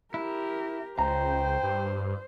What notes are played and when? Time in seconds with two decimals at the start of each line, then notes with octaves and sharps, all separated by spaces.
0.14 E4 G4 A#4
0.99 C#2 C5 G5 A#5
1.63 G2